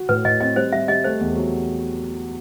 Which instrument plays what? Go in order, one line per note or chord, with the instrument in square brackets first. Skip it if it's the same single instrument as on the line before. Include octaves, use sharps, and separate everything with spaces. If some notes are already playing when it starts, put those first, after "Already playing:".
Already playing: [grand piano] F#4
[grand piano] A2 [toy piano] B4
[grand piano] A2 [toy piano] D#5
[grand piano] C4 [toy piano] D#5
[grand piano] G3 [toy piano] C5
[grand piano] G3 [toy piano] E5
[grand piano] G3 [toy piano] D#5
[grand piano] A3 [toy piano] C5
[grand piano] E2
F#3